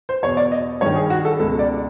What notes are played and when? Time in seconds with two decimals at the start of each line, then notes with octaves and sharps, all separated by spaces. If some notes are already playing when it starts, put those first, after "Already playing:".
0.09 C5
0.23 E2 B2 C#5
0.37 D5
0.52 D#5
0.81 G2 D#3 C#5
0.96 G#4
1.10 F#4
1.25 A4
1.40 C#2 B2 A4
1.59 D5